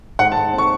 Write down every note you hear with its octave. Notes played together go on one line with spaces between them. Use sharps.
G#2 F#5
A5
G#2
C4
C#6